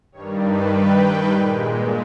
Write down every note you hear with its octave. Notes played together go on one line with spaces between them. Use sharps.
G2 D#3 G3 C#5
B4
G5
G5
A#2 G#3